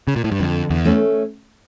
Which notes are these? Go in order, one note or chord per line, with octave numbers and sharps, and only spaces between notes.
C#3
A#2
A2
G2
F2 D3
E2
A3 C#4